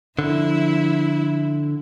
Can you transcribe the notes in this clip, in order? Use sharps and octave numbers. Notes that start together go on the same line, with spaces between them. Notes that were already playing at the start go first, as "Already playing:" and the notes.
D3 F3 E4